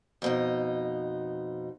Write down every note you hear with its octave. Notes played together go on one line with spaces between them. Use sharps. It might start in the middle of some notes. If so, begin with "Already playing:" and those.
F2 B2 D#4